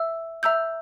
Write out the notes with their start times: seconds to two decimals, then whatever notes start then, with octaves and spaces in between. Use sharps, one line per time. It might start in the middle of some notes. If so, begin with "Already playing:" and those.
Already playing: E5 E6
0.43 E5 A#5 E6 G6